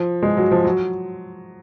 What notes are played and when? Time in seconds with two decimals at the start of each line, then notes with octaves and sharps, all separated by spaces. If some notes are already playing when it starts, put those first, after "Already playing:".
Already playing: F3
0.23 G#3
0.37 F#3
0.51 F3
0.64 F#3